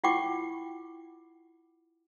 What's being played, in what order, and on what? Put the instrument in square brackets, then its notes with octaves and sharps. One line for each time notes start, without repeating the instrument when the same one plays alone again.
[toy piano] E4 F4 F#5 G5 C#6 D6